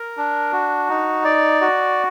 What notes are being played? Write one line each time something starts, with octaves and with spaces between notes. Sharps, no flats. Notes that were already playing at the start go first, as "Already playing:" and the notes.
Already playing: A#4
D4
F#4
D#4
D5
F#4